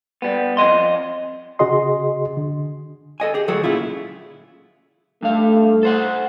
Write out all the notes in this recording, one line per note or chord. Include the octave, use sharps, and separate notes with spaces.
G3 B3
F2 D#3 D#5 C6
C#3 F#4 G#4 D#5 C6
D3
A4 D#5 G#5
G4 G#4
D2 F#3 G#4 A4
A#2 C#3 E4 F4
G2 A3 F5
A4 C5 F#5